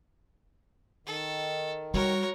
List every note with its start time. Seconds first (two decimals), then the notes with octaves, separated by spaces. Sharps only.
1.07 D#3 A4
1.94 G3 F#4 A#4 C#5